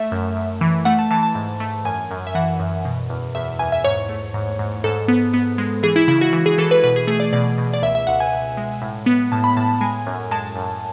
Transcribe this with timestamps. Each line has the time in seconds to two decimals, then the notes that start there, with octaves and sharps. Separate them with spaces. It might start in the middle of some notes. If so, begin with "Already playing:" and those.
Already playing: A3 E5
0.12 F#2
0.37 F#2
0.61 E3
0.85 A3 F#5
0.99 A5
1.11 E3 A5
1.23 A5
1.35 G#2
1.60 A3
1.85 F#2 G#5
2.11 F#2
2.27 E5
2.35 E3 F#5
2.60 F#2
2.85 B2
3.10 E2
3.35 E2 E5
3.59 E2 G#5
3.72 E5
3.84 G#2 C#5
4.09 A3
4.34 G#2
4.59 G#2
4.84 G#2 A4
5.08 B3
5.34 B3
5.58 G#3
5.83 E3 G#4
5.96 E4
6.08 C#3 E4
6.21 F#4
6.33 E3
6.46 G#4
6.58 E3 A4
6.71 B4
6.84 B2 B4
6.96 G#4
7.07 A3 G#4
7.20 D5
7.33 B2 D5
7.58 B2
7.73 D5
7.82 C#2 E5
7.95 E5
8.07 C#2 F#5
8.20 G#5
8.32 C#2
8.57 G#3
8.82 A2
9.06 B3
9.32 A2 A5
9.44 B5
9.57 A2 A5
9.81 G#3 G#5
10.07 F#2
10.31 G#3 A5
10.56 F#2